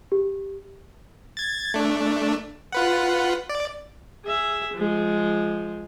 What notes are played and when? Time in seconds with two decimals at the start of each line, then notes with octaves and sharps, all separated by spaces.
0.12 G4
1.37 G#6 A6
1.74 A3 D4
2.72 F4 B4 F#5
3.49 D5
4.25 G#4 E5
4.75 F3 G#3